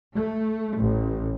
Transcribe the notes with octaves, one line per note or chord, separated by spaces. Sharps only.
A3
A1